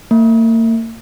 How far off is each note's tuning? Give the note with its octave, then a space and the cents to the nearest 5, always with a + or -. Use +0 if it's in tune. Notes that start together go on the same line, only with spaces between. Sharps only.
A#3 -40